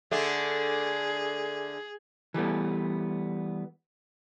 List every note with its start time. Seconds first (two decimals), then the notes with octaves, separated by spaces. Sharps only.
0.11 D3 A3 D4 G#4
2.34 E3 G3 A3 B3